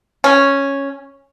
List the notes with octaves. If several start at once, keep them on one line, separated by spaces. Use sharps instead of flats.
C#4